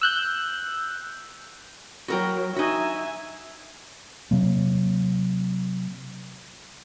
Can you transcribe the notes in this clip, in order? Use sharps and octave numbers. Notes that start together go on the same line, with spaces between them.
E6 F#6 G6
F#3 F#4 A#4 G5
D#4 F#4 E5 G#5
C3 F#3 A#3